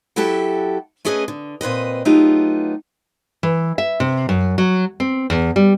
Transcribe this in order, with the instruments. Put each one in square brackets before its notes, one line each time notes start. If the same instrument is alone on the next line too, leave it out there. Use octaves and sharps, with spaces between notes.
[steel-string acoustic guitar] F#3 E4 F#4 G4 A4 E5
A3 C#4 E4 G#4 B4 D#5
D3
A#2 C4 B4 D#5
F#3 A3 B3 D#4 F4 G4
[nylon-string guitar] E3
E5
C3
F#2
F#3
C4
E2
G3